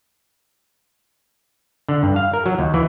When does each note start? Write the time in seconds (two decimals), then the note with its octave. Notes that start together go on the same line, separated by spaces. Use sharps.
1.88 D3
2.03 G2
2.16 F5
2.33 A#4
2.46 F#3
2.59 D#2
2.74 E3